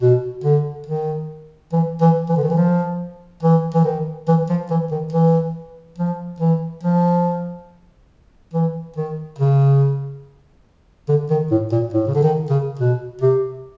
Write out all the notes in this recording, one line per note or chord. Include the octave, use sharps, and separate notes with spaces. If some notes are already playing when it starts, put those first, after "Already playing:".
B2
D3
D#3
E3
E3
E3
D3
D#3
E3
F3
E3
E3
D#3
E3
F3
E3
D#3
E3
F3
E3
F3
E3
D#3
C#3
D3
D#3
A2
A#2
A2
C#3
D3
D#3
C#3
B2
C3